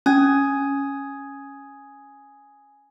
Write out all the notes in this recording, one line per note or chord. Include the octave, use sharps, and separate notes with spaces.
C#4 G#5 D#6 G#6